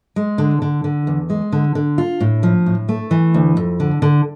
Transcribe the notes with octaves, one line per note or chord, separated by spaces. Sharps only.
G#3
D3
D3
D3
E2
G#3
D3
D3
F4
A2
F3
A2
A3
E3
D2
F2
D3
D3